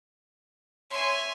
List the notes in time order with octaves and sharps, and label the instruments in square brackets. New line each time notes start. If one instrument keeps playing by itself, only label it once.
[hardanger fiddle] C#5 E5 [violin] G#5 C6